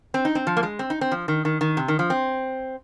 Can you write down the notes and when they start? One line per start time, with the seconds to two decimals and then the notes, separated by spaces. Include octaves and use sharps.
0.14 C4
0.25 D#4
0.35 C4
0.47 F3
0.57 A#3
0.63 G#3
0.79 C4
0.90 D#4
1.01 C4
1.12 F3
1.28 D#3
1.45 D#3
1.61 D#3
1.77 C3
1.88 D#3
1.99 F3
2.10 C4